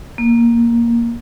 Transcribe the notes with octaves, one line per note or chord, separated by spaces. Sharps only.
A#3